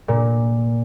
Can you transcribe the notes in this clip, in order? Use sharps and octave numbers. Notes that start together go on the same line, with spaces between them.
A#2